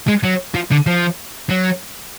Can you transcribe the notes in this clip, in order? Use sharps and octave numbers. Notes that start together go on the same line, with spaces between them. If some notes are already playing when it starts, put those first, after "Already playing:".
G#3
F#3
F3
D3
F3
F#3